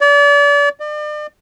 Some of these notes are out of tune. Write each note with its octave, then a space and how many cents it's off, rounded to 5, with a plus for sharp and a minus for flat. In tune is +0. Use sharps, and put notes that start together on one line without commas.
D5 -35
D5 +40